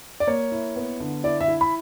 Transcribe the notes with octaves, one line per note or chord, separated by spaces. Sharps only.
D5
A#3 C#5
E4
B3
D3
E4 D5
E5
E4
B5